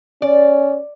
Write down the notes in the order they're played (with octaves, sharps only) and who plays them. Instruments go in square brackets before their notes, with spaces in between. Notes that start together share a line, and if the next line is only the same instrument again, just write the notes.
[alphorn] C#4 [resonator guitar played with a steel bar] D5